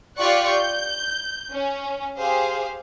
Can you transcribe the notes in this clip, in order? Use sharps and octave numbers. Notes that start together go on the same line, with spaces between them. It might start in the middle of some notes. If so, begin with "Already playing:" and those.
F4 G4 D5 C#6 F#6
G6
C#4
G4 G#4 C5 F5